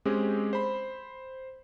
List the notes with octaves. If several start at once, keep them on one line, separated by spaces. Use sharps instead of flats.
G#3 C4 C#4 G4 G#4
C5 B5